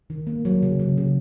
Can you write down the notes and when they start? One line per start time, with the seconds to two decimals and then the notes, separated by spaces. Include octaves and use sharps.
0.10 D#3
0.27 A#3
0.45 F#3
0.63 C#3
0.79 C#3
0.98 C#3